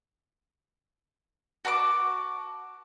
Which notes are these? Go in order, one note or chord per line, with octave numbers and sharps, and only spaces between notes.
F#4 A5 B5 D6